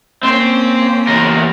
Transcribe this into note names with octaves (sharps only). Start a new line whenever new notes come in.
A#3 C4 C#4 C5
E2 A#4